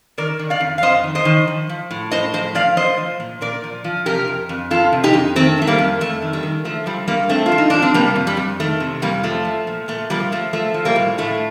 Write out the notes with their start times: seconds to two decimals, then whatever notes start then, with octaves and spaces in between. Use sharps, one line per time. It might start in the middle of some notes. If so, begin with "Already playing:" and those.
0.18 D#3 A#4 D5
0.39 D#3
0.50 D5 F5
0.61 F2
0.78 F5
0.83 F2 C5 D#5
1.04 D#3
1.15 C5 D#5
1.25 D#3
1.47 F3
1.69 F3
1.91 A2
2.11 A2 C5 D#5
2.33 F3 C5 D#5
2.55 F3 D5 F5
2.77 F3 C5 D#5
2.98 F3
3.20 A#2
3.41 A#2 A#4 D5
3.64 F3
3.84 F3
4.06 C3 G4 A#4
4.28 F2
4.49 F2
4.71 F3 F4 A4
4.92 C3
5.04 D#4 G4
5.14 F2
5.36 D#3 A3 C4
5.58 D#3 A3
5.67 G3 A#3
5.79 F2
6.01 F2 A3
6.22 D#3
6.33 G3
6.43 D#3
6.65 F3 A3
6.86 F3 G3
7.08 G2 G3 A#3
7.29 G2 A3 C4
7.46 F4
7.52 F3
7.58 D#4
7.70 F3 D4
7.82 C4
7.94 C3 G3 A#3
8.16 F2
8.27 G3
8.37 F2
8.60 D#3 A3
8.80 C3
9.02 F2 G3 A#3
9.23 F3 A3
9.45 F3
9.67 A#2
9.88 A#2 A3
10.10 F3 G3 A#3
10.32 F3 A3
10.53 F3 A3
10.74 F3
10.85 G3 A#3
10.96 A2
11.18 A2 A3